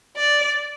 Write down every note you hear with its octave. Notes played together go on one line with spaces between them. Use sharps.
D5